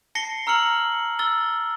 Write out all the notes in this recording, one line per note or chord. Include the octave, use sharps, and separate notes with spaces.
A5 A#6 C7 C#7 G7
A#5 E6 F6 C#7 F#7
E6 A6 G7